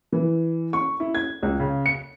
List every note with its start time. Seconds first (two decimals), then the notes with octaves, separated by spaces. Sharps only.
0.13 E3
0.73 C#6
1.00 E4
1.15 G#6
1.43 C#2
1.59 C#3
1.86 C#7